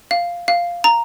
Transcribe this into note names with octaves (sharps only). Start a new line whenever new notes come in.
F5
F5
A#5